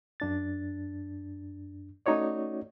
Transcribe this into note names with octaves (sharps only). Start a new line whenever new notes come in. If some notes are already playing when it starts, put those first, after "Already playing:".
F#2 D4 A6
A3 C#4 D#4 F#4 C#5 D5